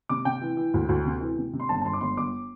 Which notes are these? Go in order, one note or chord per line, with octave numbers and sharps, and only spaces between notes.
C3 D6
C3 G5
E3
E3
D2
D2
C3
E3
C3
C3
C6
G1 A5
A5
G1 C6
D6
G1 C6
G1 D6